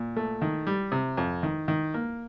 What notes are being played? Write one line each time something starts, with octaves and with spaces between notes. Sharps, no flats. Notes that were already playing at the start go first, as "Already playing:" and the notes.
Already playing: A#2
A3
D#3
G3
C3
F2
D#3
D#3
A#3